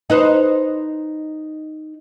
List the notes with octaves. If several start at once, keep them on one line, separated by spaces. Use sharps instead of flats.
D#4 B4 C5